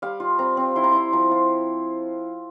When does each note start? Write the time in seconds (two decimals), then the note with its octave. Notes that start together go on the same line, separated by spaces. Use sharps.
0.02 G3 F5
0.20 F4
0.39 C4 A#5
0.57 C4
0.76 E4 C6
0.84 A#5
0.92 E4 C6
1.13 F3 A#5
1.31 F4